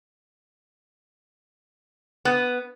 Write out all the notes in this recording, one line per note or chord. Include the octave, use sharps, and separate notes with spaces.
B3